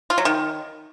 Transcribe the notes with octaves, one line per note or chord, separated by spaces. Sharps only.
F4
F#3
D#3